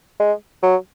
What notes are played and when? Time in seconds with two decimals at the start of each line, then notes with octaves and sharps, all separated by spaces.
0.20 G#3
0.63 F#3